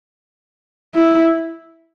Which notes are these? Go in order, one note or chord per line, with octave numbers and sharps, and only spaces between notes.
E4